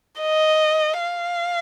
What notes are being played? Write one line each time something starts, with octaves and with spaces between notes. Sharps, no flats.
D#5
F5